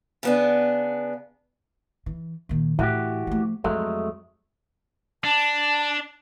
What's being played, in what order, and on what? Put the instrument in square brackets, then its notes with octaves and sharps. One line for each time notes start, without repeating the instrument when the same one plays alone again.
[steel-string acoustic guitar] C#3 B3 D4
[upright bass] E3
A#2 D#3
[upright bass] A2 [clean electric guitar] E3 F#4 G4
[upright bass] F3 A3
[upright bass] F2 [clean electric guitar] F#3 G#3 A3
[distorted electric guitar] D4 [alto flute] A5